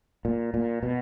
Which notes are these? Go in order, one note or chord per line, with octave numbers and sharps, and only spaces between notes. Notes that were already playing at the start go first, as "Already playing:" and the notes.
A#2
A#2
B2